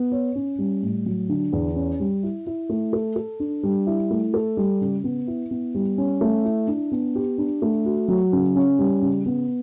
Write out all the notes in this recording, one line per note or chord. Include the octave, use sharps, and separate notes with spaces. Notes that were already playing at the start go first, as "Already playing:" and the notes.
Already playing: B3
C#5
C#4
G3
A2
F#3
D3
E2
C#4
G3
E4
E4
A3
A4
A4
D4
G3
E4
A3
A4
G3
C#3
B3
E4
B3
G3
C#4
A3
E4
D4
B3
G4
D4
A3
F#4
F#3
C#3
C#4
G3
C#3
B3